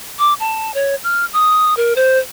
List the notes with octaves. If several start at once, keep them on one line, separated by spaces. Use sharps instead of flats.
D6
A5
C#5
F6
D#6
A#4
C5